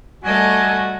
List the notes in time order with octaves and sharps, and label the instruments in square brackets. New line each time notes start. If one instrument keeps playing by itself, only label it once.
[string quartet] G3 A3 D#5 [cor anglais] F#4 [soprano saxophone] G#5